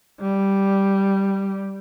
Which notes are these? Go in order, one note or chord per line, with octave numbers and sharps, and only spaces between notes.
G3